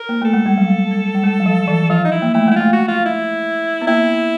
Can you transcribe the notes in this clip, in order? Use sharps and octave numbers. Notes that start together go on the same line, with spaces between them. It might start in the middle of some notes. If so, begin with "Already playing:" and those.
Already playing: A#4
A#3
A3 A4
G#3
G3
F#3
G3
G3
G#3
F#3
F3
E3
F3 F4
D#4
E4
A#3
A3 E4
G#3 E4
A3 F4
F#4
F4
E4
B3
A#3 E4